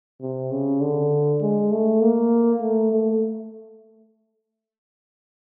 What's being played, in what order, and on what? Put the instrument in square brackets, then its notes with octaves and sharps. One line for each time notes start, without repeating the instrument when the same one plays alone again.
[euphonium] C3
C#3
D3
G#3
A3
A#3
A3
A3